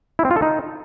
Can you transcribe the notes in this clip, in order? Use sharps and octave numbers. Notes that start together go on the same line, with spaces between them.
E4
C4
F4
A4
D#4